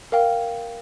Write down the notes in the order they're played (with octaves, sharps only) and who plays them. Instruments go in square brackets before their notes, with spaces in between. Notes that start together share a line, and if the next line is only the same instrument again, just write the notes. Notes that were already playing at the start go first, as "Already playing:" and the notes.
[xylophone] A#4 F5 G5